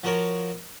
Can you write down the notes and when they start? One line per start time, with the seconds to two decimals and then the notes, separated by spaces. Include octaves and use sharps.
0.04 F3 F#4 A#4 C#5